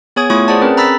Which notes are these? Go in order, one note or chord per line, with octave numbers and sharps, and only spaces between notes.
B3 G#4 C#5 G#5 D#6 G#6
A3 E4 F4 C#5 C#6 D#6
G#4 C5 D5 F#5 A5
C4 C#4 G#4 A#4 B4
A#5 B5 E6 A6 B6